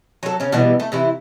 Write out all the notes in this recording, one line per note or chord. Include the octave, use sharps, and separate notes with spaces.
F#3 A4
C#3 C#4
B2 E3 G3 B3
A3
C3 E3 E4